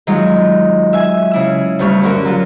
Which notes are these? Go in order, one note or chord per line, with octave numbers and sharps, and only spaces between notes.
D#3 F#3 G#3 D#4 F4
E5 G#5
C#3 E4 E6
D2 G2 C#6 F6
D3 C#4 F#4 A#4
F#3 F4